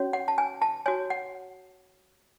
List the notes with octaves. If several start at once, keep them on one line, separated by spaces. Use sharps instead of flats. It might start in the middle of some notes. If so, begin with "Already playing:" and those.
Already playing: C#4 F#4 C#5
F#5
A5
G#5
A5
F#4 C#5 G#5
F#5